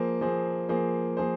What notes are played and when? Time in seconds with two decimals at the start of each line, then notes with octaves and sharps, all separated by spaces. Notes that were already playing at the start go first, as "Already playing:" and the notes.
Already playing: F3 A#3 G#4 C5
0.21 F3 A#3 G#4 C5
0.69 F3 A#3 G#4 C5
1.17 F3 A#3 G#4 C5